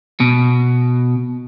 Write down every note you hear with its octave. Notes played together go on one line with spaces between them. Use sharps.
B2